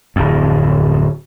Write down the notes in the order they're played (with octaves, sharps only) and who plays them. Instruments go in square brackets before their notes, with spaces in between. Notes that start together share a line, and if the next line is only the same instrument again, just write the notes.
[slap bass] D1 F2